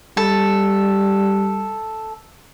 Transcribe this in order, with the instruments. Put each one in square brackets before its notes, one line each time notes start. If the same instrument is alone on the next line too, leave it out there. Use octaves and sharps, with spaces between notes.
[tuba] G3 [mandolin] A4